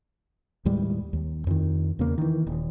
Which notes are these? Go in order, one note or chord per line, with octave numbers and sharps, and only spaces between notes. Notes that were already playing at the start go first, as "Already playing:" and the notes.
D#2 A2 G3 G#3
D#2
F2 D#3
E2 C#3 A#3
D#3 E3
D#1